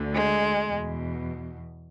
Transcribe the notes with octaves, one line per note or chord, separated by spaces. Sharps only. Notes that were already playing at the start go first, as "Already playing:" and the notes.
Already playing: D2 D3
G#3
E2 B2